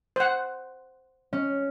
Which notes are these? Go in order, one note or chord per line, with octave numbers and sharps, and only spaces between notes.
C5 F#5
C#4